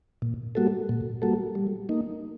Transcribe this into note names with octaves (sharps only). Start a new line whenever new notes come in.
A#2
G3 A#3 F#4 A4
A#2
G3 A#3 F#4 A4
G3
A#3 D#4